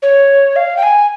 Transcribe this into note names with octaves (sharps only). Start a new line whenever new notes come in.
C#5
F5
G5
G#5